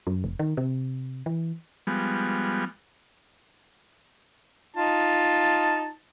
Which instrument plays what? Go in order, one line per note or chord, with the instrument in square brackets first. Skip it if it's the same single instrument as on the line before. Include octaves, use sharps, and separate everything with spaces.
[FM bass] F#2
F1
D#3
C3
E3
[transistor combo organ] F3 G3 G#3 B3
[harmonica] D#4 F4 A5